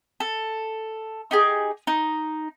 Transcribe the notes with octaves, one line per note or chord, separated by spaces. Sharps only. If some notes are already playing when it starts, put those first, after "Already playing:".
A4
D#4 G4 G#4
D#4